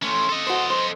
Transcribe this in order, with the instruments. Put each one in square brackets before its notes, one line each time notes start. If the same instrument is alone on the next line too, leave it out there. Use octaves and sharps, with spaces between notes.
[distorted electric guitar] A3 C#4 [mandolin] C5 C6 F6
[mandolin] C#4 [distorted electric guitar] A4 D#5
[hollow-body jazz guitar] F#4 C5 [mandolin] B4 E5 C6
[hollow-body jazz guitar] C5